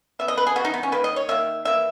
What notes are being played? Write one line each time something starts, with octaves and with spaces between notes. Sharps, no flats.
E3 B3 E5
D#5
B4
G#4
E3 B3 F#4
D#4
B3
C#4
D#3 A#3 B4
D#5
C#5
D#3 A#3 E5
E3 A#3 E5